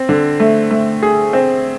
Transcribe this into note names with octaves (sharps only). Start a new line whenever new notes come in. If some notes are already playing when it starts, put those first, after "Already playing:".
Already playing: C4
D3
A3
A3
G#4
C4